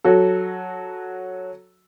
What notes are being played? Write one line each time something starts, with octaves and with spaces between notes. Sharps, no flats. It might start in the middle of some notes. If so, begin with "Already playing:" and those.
F#3 F#4 A4